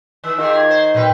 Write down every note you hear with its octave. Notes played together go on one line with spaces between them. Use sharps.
D#3 E6
D#3 F4 G4 G#4
G#6
C5
A#2 F#3 C4 B4